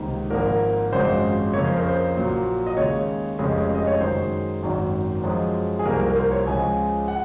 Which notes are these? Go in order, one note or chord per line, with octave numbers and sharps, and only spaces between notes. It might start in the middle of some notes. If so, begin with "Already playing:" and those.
Already playing: C#2 C3 D#3 A#3
G#1 G#2 F3 A#3 A#4
G#1 F#2 C#3 F3 G#3 C5
F2 C#3 F3 A#3 C#5
C5
A#4
C5
A#1 A#2 F#3
D#5
D#2 C#3 G#3 C#5
F1 F2 C#3 G#3
D#5
C#5
F#2 D#3 G#3 C5
G#1 F#2 D#3
F#2 F3 G#3
G#4
C2 C3 F3 A#3 A#4
A#4
A#4
C5
C#5
C#2 C#3 F3 G#3 G#5
F#5